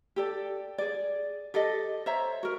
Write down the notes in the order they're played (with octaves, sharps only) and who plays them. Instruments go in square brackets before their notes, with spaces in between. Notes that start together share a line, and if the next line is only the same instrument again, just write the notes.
[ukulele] G4 A4 D5
G#4 D5
G4 A4 D5 D#5
C5 C#5 E5 A#5
F#4 A#4